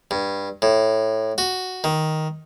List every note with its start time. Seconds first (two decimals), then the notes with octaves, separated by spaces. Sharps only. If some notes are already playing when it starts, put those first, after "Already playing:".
0.11 G2
0.62 A2
1.38 F#4
1.84 D#3